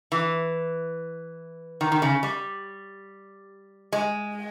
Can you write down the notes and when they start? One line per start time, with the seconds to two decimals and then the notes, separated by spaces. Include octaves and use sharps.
0.12 E3
1.81 D#3
1.92 D#3
2.02 C#3
2.23 G3
3.92 G#3